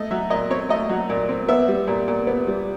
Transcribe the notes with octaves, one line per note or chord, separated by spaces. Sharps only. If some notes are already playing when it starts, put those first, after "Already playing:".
Already playing: A3 D#5
F#3 E5
A#2 D#5
C4 C#5
A3 D#5
F#3
A#2
C4
B3 E5
G3
A#2
A#2
B3
G3